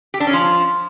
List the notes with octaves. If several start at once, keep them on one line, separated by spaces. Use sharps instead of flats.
G4
D4
C#4
F3